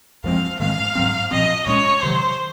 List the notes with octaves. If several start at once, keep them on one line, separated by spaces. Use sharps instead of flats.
F#2 F3 G#3 C4 F5
G#2 D#3 G#3 C4 F5
G#2 F#3 C4
A#2 F3 C4 D#5
A#2 G#3 C#4 C#5
C3 D#3 F#3 C5